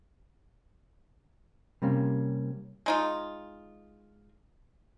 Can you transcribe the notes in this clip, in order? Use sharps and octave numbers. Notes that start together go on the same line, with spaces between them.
C3 G3 A#3 C#4
G#3 D#4 F4